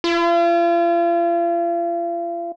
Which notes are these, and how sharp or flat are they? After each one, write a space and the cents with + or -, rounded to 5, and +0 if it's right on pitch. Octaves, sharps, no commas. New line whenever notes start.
F4 -40